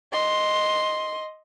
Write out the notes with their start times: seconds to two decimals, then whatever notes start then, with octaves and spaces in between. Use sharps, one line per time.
0.13 D#5 C6